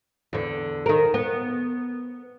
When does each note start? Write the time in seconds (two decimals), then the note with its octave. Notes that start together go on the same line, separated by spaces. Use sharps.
0.33 E2 D3
0.86 D#3 A#4
1.14 B3